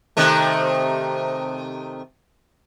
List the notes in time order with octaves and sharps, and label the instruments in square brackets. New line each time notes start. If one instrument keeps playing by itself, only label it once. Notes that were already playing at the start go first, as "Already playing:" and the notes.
[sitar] C3 D#3 A3